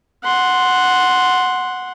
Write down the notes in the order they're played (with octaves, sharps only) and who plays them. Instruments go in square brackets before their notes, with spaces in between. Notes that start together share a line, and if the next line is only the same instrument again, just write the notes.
[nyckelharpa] F#5 C6